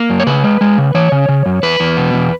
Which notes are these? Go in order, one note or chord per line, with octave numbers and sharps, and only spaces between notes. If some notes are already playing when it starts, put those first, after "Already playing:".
Already playing: A#3
F#2
C#5
C#3 B4
G#3
G#3
C#3
E3 C#5
C#3
C#3
F#2
E2 B4
E2
B2
E2